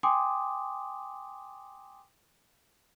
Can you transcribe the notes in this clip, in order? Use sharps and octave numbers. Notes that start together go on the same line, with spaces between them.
G5 G#5 C6 D6 D#6